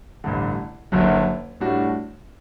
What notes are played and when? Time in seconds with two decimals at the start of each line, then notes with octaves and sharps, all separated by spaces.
0.24 A1 G2 D3
0.92 F#1 F#2 D3 F#3
1.60 A2 G3 D4 F#4